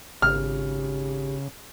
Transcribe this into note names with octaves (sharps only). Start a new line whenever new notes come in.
G#1 C#3 G4 F6